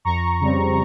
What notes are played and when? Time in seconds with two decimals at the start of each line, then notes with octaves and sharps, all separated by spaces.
0.05 F2 A#5 C#6
0.40 C#3 G3 C4